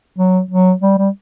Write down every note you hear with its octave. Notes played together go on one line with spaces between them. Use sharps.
F#3
F#3
G3
G3